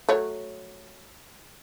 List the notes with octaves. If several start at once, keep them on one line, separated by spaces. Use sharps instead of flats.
F#3 A3 C#5